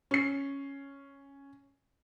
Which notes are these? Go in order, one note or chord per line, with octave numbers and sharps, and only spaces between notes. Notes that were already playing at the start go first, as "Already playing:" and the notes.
C#4 C7